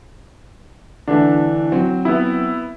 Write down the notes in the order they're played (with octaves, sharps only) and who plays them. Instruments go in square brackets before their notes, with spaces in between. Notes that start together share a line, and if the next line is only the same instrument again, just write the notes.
[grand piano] D3 E3 A3 [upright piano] D4
[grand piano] F#3 C4
[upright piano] B3 E4